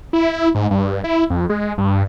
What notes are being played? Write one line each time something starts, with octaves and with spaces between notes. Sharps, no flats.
E4
G#2
G2
E4
F2
G#3
G2